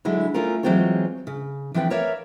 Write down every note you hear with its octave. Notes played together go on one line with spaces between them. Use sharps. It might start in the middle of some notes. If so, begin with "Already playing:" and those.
D3 F#3 G#3 E4
A3 C#4 D4 F4 A#4
E3 F#3 G#3 C4 F4 C#5
C#3
E3 F3 C4 B4 G5
A#4 B4 C#5 D5 E5 F5